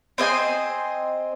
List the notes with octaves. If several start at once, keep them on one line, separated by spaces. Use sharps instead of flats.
C4 C5 D#5 G#5